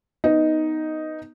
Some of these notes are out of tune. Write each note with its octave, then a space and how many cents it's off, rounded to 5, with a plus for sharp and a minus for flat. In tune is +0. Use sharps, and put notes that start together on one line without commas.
B3 +0 D#4 +0